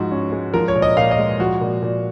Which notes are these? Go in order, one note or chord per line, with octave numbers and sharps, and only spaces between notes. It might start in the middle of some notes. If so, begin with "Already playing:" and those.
Already playing: G#2 F3 F#4
C#4
G#3
F3 A#4
C#5
A#2
D#5
A#2 F5
D#5
G#3
F3 F#4
A#2
A#2